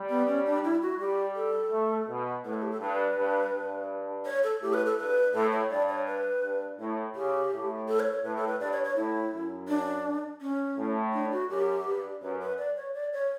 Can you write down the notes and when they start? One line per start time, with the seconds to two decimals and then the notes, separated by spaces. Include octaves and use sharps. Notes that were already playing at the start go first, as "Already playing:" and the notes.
Already playing: G3
0.10 B3
0.28 C#4
0.46 D4
0.64 E4
0.82 F#4
1.00 G3 G4
1.36 A4
1.72 A3
2.09 B2
2.45 A2 B4
2.54 A4
2.62 G4
2.71 A4
2.80 G2 B4
3.16 G2
3.53 G2
4.26 C#5
4.44 A4
4.62 A2 G4
4.73 B4
4.86 A4
4.98 G2 B4
5.34 A2 A4
5.52 C#5
5.70 G2 D5
5.89 C#5
6.07 B4
6.43 G2
6.79 A2 C#5
7.15 C#3 G4
7.52 A2
7.88 A4
8.00 C#5
8.12 C#5
8.24 A2 B4
8.36 A4
8.48 B4
8.60 G2 D5
8.73 C#5
8.84 C#5
8.96 A2 E4
9.32 F#2
9.68 D4
10.41 C#4
10.77 A2
11.13 D4
11.32 F#4
11.50 F#2 G4
11.86 G2
12.22 F#2 B4
12.40 B4
12.58 D5
12.77 C#5
12.94 D5
13.13 C#5